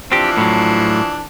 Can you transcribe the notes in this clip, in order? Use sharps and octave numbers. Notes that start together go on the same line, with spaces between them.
E3 F3 C4 D4 G4
A2 F#3